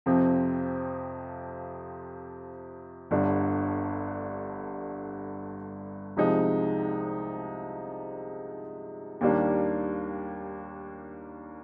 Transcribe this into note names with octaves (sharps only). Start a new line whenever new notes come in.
F2 C3 F3 C4
G1 G2 D3
C2 C3 F3 G#3 D#4
D#2 D#3 G3 A#3 D4